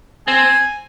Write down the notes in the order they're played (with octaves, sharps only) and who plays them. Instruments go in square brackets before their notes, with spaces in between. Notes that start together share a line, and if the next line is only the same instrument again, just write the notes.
[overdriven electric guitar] C4 [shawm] G#5